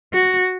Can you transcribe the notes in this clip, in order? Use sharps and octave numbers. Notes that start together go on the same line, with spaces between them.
F#4